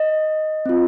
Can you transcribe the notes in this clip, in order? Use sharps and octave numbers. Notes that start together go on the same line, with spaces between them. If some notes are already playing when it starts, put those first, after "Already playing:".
Already playing: D#5
C4 F4